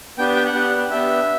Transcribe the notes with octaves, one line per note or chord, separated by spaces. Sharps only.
B3 D4 G4 G5
G5
F#5
B3 D4 G4
B3 D4 G4 E5